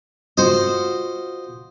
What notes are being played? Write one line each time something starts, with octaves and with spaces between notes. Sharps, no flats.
F4 F#4 C5 D#5